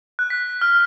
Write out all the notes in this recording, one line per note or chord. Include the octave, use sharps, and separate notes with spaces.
F#6
B6
F6